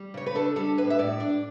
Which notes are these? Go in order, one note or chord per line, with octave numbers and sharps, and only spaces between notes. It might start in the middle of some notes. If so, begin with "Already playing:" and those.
Already playing: G3
C#3 C#5
B4
D4 A4
G3 A4
A2 B4
E5
A2 D5
D4